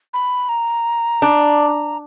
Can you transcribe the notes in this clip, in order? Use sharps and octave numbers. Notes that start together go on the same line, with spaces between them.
B5
A#5
D4